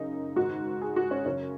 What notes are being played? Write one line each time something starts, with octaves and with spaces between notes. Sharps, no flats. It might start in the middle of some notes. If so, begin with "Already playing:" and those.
Already playing: F#2 C#3 D#4
G#2 D#3 F#4
G#4
F#4
C#4
F#2 C#3 C#4